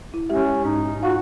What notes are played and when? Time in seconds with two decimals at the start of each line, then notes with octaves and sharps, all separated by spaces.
0.14 E4
0.29 G#3 C#4 G4 E5
0.64 G#2 D#4
1.03 F4 F#4 F5